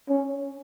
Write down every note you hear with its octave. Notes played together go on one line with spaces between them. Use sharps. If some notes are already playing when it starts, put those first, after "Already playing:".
C#4